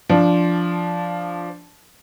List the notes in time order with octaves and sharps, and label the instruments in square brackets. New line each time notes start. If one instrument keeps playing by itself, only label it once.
[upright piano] F3 D4